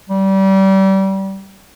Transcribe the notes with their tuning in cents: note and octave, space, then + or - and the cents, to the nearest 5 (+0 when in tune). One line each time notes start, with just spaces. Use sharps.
G3 -25